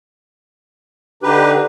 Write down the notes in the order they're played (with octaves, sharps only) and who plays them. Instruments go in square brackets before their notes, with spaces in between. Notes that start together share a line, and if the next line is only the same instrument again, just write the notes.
[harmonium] D3 D4 D#4 [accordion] G4 B4